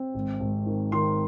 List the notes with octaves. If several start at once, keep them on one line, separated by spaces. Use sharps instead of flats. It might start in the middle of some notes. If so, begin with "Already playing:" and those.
Already playing: C4
G#1
G#1
D#3
D#3 C6